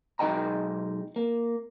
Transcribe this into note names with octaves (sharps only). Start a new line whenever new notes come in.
B1 G#3 D#4 D#5 G5 A#5
A#3